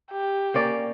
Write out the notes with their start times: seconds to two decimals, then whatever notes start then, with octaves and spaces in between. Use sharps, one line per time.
0.12 G4
0.54 A#3 C#4 D5